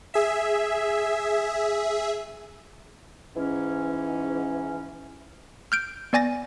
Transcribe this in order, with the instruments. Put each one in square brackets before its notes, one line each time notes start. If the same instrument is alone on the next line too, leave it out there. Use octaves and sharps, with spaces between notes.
[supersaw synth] G#4 E5
[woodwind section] G#2 E3 C#4
[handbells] F6 G6 D7
B3 D5 G#5 A6 A#6